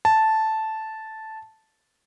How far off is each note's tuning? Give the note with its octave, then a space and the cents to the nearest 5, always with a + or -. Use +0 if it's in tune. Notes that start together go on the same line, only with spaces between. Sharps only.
A5 -5